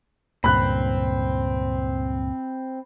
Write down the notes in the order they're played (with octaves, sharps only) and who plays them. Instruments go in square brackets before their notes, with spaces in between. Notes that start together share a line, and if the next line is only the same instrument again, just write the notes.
[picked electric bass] C#2 G2 A#2 [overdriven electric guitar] C4 [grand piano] B5 F#6